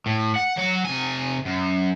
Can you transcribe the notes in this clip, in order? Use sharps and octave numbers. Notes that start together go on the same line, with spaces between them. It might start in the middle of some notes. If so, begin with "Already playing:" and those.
A2
F#5
F#3 F#5
C3 G#5
F#2